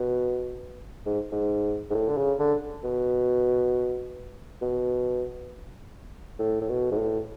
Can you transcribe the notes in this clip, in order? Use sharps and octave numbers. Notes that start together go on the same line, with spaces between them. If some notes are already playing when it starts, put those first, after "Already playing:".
Already playing: B2
G#2
G#2
G#2
A2
D3
C#3
D3
B2
B2
A2
A2
B2
G#2
A2